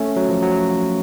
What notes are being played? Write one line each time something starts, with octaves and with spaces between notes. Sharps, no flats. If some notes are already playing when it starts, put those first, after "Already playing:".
Already playing: A3 C#4
F#3
F3
F#3